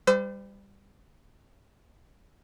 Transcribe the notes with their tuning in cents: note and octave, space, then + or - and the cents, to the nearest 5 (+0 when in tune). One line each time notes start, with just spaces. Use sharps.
G3 +20 C5 -35 E6 +0